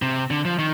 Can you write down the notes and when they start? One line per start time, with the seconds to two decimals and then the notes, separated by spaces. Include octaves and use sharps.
0.02 C3
0.31 D3
0.45 F3
0.59 D#3